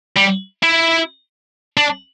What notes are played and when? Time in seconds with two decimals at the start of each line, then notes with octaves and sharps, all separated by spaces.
0.17 G3
0.63 E4
1.77 D4